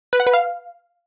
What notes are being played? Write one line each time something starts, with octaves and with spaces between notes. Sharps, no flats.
B4
F#5
B4
F5